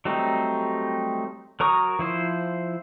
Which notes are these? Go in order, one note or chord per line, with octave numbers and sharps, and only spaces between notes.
F#3 G3 A3 C4 D#4
F#3 A#4 A#5 C#6 D#6
F3 E4 C5